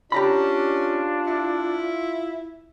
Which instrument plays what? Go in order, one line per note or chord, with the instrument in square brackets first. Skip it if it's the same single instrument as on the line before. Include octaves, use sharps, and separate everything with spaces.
[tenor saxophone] C#4 [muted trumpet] D4 [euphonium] F4 [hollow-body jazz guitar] G4 A#5 B5
[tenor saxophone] E4